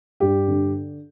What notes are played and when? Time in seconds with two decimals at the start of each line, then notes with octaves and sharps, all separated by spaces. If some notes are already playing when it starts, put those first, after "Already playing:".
0.20 G2 G4
0.48 D3